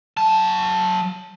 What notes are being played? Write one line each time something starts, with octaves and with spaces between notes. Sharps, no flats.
F#3 A5